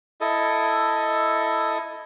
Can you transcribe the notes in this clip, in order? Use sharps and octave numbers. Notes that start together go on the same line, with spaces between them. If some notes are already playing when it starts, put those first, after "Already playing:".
E4 A4 D#5